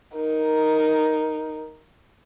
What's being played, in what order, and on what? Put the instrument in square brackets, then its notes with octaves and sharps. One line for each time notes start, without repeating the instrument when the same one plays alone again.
[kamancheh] D#4 A#4